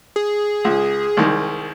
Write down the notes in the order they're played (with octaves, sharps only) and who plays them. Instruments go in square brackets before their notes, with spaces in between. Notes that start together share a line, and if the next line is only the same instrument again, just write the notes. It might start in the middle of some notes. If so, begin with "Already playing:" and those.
[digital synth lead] G#4
[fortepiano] C#2
C2 D#3 G#3